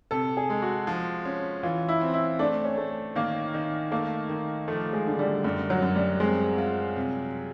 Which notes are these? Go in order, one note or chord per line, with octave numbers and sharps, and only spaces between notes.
C3 A4
G#4
G#3
F#4
F3
C#4
E3 F4
E4
C4
E4
A3 D4
C#4
A3
D#3 A#3
D#3
A3 A#3
D#3
F3 A3
G#3
D3
G3
F#2 G3
F#3
F#2
G3
G#3 C4
F4
C3